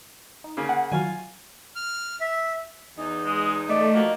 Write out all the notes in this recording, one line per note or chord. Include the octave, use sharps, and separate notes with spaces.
D#4
C#3 A#3
F#5
D#3 F#3 F4 F#4 G#5
F6
E5
E2 D#4
G#3
A3 D5 D#5
F3 A#3 D#4 F#4